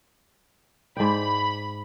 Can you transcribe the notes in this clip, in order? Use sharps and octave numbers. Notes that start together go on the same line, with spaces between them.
G#2 D5 G5 B5